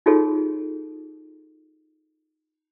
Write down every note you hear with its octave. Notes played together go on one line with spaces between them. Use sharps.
D#4 F4 F#4 G#4 A4 C#5